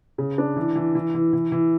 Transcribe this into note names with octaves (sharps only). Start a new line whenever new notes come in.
C#3
D4
E3
E3
E3
E3
E3
E3